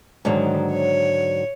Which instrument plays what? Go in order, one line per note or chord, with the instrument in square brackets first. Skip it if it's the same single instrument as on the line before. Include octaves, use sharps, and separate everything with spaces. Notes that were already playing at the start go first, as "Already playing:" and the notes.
[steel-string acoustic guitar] G#2 D3 F#3 [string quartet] D#3
[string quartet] C#5